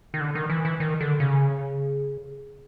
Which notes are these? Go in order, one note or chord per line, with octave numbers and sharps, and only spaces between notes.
D#3
D3
D#3
E3
E3
D#3
D3
C#3